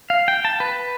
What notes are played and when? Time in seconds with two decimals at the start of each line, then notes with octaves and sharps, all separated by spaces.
0.10 F5
0.28 G5
0.45 A5
0.60 B4